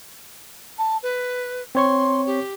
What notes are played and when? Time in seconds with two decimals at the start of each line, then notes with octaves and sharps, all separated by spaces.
0.78 A5
1.02 B4
1.75 C4 C#5 C6 C#6
2.26 G4